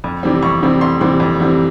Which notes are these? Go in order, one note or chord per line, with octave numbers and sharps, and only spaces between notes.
F2
C3 E3 G3 C4
F2 C#6
C3 E3 G3 C4
F2 C6
C3 E3 G3 C4 C6
F2
C3 E3 G3 C4